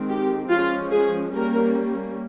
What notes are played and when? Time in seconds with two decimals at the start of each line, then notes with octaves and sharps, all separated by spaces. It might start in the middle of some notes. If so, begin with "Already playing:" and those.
Already playing: D#3 G#3 C4
0.09 G4
0.50 F3 G#3 C#4 F4
0.91 G#4
1.33 G3 A#3 C#4 A#4